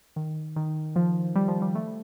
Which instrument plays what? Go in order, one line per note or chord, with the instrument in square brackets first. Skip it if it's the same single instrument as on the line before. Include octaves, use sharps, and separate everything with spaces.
[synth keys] D#3
D#3
F3
G3
F3
G3
A3